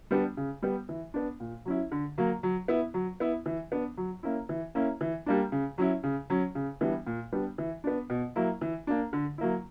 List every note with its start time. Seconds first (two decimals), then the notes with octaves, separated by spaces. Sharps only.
0.11 G3 B3 D4
0.37 C#3
0.62 G3 B3
0.89 E3
1.14 B3 D4
1.40 A#2
1.65 F#3 C#4 E4
1.91 D3
2.18 F#3 A#3
2.43 F#3
2.68 B3 E4
2.94 F#3
3.20 B3 E4
3.46 E3
3.72 B3 D4
3.97 F#3
4.23 A#3 C#4 E4
4.49 E3
4.75 A#3 C#4 E4
5.01 E3
5.26 G3 A#3 D4
5.52 C#3
5.78 F#3 C#4 E4
6.04 C#3
6.30 F#3 C#4
6.55 C#3
6.81 E3 G3 B3 D4
7.07 A#2
7.33 G3 B3 D4
7.58 E3
7.84 B3 D4
8.10 B2
8.36 F#3 A#3 E4
8.61 E3
8.87 A#3 D4
9.13 D3
9.38 F#3 A#3 E4